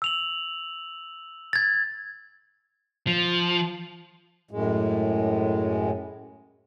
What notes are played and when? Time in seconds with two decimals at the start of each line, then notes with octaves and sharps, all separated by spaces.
0.02 E6 F7 F#7
1.53 G#6 A6
3.07 F3
4.51 F#2 A2 G#3